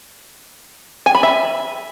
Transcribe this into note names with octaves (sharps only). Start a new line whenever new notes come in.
G#5
B5
E5